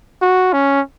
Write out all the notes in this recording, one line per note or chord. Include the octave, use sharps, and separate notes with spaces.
F#4
C#4